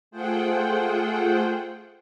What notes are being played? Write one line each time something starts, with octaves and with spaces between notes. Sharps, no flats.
A3 F4 G#4 C5 F#5 G5